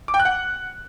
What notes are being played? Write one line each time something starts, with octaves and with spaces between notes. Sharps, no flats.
D6
G5
F#6
F#5